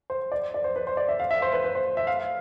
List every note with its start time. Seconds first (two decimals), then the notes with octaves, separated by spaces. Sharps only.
0.10 C5
0.32 D5
0.54 D5
0.64 C5
0.76 B4
0.87 C5
0.97 D5
1.09 E5
1.20 F5
1.31 E5
1.42 C5
1.53 B4
1.64 B4
1.75 C5
1.97 E5
2.07 F5